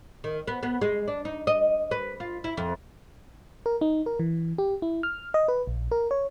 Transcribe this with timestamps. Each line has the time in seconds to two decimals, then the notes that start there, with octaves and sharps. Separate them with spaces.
0.24 D#3
0.48 B3
0.63 B3
0.81 G#3
1.08 D4
1.25 D#4
1.47 D#5
1.91 B4
2.20 F4
2.44 E4
2.57 F2
3.66 A#4
3.81 D#4
4.06 A#4
4.19 E3
4.58 G4
4.82 E4
5.03 F6
5.34 D#5
5.48 B4
5.67 A#1
5.92 A#4
6.11 C#5